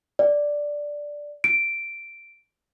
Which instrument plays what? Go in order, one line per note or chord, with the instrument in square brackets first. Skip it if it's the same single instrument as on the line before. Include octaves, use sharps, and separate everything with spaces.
[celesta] D5
D7